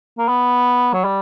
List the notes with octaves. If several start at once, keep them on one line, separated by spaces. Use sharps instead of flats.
A#3
B3
F#3
G3